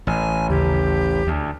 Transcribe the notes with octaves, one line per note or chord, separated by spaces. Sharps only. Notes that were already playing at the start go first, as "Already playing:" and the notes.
A1 G#5
D#2 C#3 G4
D2